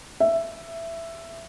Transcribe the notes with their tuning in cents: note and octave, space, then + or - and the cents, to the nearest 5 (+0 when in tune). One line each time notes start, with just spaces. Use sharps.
E5 +10